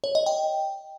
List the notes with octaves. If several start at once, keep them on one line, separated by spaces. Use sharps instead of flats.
C#5
D#5
G5